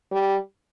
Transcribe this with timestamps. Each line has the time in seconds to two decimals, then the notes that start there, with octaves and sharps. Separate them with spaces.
0.11 G3